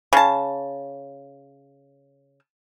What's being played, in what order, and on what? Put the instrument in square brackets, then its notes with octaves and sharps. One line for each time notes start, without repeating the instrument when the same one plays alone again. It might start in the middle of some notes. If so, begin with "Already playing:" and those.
[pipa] C#3 A5